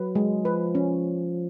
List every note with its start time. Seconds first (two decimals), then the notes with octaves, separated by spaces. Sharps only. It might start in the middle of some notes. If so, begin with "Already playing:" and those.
Already playing: F#3 B4
0.15 G#3
0.45 F3 B4
0.75 C#4